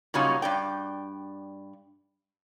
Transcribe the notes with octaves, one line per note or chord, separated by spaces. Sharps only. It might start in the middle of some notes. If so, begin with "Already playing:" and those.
A#2 C#3 F#3 G3 C#4 D#4
G2 D5 G5